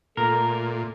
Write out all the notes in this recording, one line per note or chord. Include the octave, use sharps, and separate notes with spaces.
A#2 A3 A4 A#4